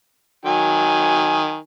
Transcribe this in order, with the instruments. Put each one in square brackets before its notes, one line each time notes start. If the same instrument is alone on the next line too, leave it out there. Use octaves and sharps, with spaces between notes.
[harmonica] D#3 F#3 G#5